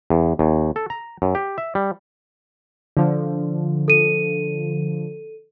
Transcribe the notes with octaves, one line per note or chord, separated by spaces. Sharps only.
E2
D#2
A4
A#5
F#2
G4
E5
G3
D3 F3
A4 D#7